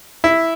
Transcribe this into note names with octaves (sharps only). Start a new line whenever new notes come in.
E4